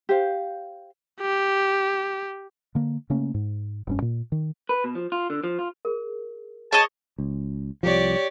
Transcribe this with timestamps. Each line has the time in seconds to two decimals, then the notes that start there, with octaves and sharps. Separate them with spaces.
0.09 G4 C5 F5
1.21 G4
2.75 D3 A#3
3.10 C#3 A3 A#3 C#4
3.34 G#2
3.87 F1 G2 C#4
4.02 A#2
4.32 D#3
4.69 B4
4.84 B2
4.95 F3
5.12 F4
5.30 D3
5.44 F3
5.59 F4
5.85 G#4 A#4
6.72 G#4 C#5 D#5 A5
7.18 C#2
7.83 C2 F3 G4 C#5 D5